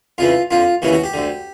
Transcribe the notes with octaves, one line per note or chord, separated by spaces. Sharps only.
F2 C#3 E3 F4
F2 D3 F4
D#2 C#3 E3 F#4
F#4
G4
D2 D3